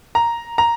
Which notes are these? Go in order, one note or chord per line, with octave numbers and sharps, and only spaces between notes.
A#5
A#5